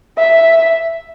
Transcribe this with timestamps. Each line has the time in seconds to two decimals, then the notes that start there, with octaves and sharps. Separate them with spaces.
0.18 E5